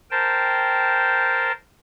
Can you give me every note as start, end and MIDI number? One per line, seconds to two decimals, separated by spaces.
0.11 1.52 70
0.11 1.52 72
0.11 1.52 79
0.11 1.52 81